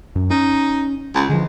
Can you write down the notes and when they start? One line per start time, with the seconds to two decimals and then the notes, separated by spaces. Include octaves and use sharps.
0.16 F#2
0.30 C#4 D#4
1.15 C#2
1.29 D3 F3 G#3